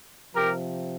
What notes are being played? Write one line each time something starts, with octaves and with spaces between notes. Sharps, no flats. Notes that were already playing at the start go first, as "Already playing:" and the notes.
C3 F3 G4 A#4